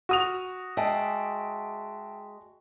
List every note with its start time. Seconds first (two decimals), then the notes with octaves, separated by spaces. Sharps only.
0.09 F#4 D#6 F7
0.77 G#3 E5 G5 A5